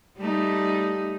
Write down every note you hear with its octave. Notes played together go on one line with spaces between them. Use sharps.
G3 A3 D#4